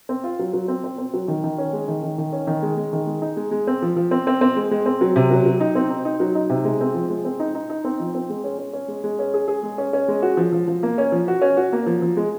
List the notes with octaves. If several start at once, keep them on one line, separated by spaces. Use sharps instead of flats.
C4
F4
F#3
F#3
C4
C4
C4
F#3
D#3
D#3
C#4
G#3
D#3
D#3
D#3
C#4
D#3
G#3
G#3
D#3
G#3
D#4
G#3
G#3
C4
F3
F3
C4
C4
C4
G#3
G#3
C4
F#3
C3
F#3
F#3
D#4
C4
D#4
D#4
F#3
D#4
C3
G#3
C4
F3
G#3
C4
D#4
D#4
D#4
C4
F3
C4
G#3
C#4
C#4
C#4
G#3
G#3
C#4
G#4
G#4
G#3
C#4
C#4
G#3
F#4
F3
F3
F3
A#3
C#4
F3
F#4
C#4
F#4
A#3
F3
F3
G#3